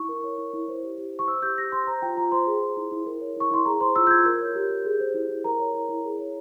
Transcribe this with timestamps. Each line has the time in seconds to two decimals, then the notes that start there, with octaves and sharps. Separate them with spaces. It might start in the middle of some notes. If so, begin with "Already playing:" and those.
Already playing: E4 C#6
0.09 A#4
0.24 C#5
0.38 E4
0.53 E4
0.68 C5
0.83 G4
0.98 G4
1.13 C5
1.19 C#6
1.28 C5 E6
1.42 G4 G6
1.57 G4 A#6
1.72 C5 C6
1.87 C5 A#5
2.02 F4 G5
2.17 F4 A#5
2.32 C5 C6
2.47 G#4
2.62 C5
2.77 E4
2.91 E4
3.06 A#4
3.21 C#5
3.37 E4 C#6
3.51 E4 C6
3.66 G#4 A#5
3.81 C5 C6
3.96 F4 E6
4.07 G6
4.10 F4 G#6
4.25 A#4 G6
4.41 C#5
4.55 G4
4.70 G4
4.85 G#4
5.00 C5
5.14 E4
5.29 E4
5.44 A#4 A#5
5.59 C#5
5.74 E4
5.89 E4
6.04 G#4
6.19 C#5